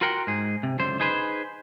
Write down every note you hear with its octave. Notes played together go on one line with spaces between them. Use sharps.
F4 F#4 A#4 F#5 G5 C6
G#2 G#4
C3
C#2 F#2 D3 C5
D#4 G#4 B4 C5